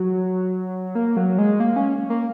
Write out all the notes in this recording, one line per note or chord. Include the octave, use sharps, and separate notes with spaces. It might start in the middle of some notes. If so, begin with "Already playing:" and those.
Already playing: F#3
A#3
F#3
G#3
A#3
C#4
A#3